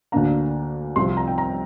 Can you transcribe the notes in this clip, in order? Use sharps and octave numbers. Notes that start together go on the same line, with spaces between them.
D2 D3 A#3 D4 A#5
C2 C3 F3 C6
A#5
G5
A#5